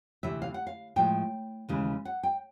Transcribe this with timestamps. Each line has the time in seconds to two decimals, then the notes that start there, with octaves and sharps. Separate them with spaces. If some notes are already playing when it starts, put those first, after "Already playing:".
0.23 D2 C3 E3 E5
0.42 F5
0.54 F#5
0.67 F5
0.96 A2 F3 G#3 G5
1.69 D#2 C#3 E3 G#3
2.05 F#5
2.23 G5